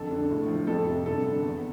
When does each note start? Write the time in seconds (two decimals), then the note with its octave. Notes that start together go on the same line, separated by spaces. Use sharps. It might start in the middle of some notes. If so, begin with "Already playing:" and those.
Already playing: F2 D3 A4
0.11 D3
0.31 A2
0.48 F3
0.67 F2 A4
0.87 C3
1.06 G2 A4
1.25 D3
1.43 E2